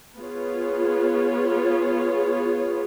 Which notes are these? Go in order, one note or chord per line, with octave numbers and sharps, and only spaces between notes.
B3 F4 G#4 C#5